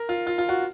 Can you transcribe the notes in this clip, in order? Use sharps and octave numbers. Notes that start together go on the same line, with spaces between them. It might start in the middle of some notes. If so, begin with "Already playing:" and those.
Already playing: A#4
F4
F4
F4
F#4